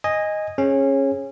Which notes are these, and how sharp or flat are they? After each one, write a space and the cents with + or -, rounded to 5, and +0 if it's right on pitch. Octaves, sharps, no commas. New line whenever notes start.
D#5 +0 G#5 -15
C#4 -20 G#4 +0